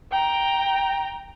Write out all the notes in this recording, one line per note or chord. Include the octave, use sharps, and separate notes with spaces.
G5 A#5